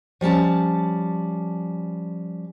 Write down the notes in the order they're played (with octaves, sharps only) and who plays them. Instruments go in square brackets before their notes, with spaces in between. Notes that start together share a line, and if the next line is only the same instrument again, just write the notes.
[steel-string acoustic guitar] F3 G3 C#4 A5